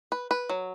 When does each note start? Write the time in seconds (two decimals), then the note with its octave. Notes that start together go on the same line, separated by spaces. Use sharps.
0.12 B4
0.31 B4
0.49 F#3